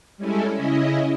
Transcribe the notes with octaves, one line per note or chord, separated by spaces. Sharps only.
G3 G#3 C#4 E4 G#4 A4
C#3 C#4 E4 D#5